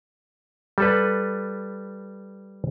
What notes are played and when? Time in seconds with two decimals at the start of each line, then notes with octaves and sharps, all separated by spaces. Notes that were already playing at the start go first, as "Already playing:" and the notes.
0.78 G3 A4 B4